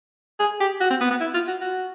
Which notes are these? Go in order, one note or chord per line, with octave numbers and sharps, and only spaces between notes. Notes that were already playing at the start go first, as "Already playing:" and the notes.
G#4
G4
F#4
C4
B3
B3
E4
F4
F#4
F#4